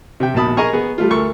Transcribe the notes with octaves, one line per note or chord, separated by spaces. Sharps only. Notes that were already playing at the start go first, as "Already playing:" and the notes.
C3 E5 G5
A#1 D#2 B2 A5 B5 D#6
G#4 A#4 D#5 G#5 A#5 C#6
B3 G#4
G3 A3 F4
D2 A4 A#4 C#6